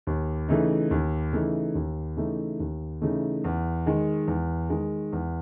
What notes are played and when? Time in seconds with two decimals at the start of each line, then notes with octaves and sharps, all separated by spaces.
0.07 D#2
0.48 C#3 E3 A3 D#4
0.91 D#2
1.32 C#3 E3 A3 D#4
1.75 D#2
2.17 C#3 E3 A3 D#4
2.60 D#2
3.01 C#3 E3 A3 D#4
3.44 E2
3.86 D#3 G#3
4.27 E2
4.70 D#3 G#3
5.13 E2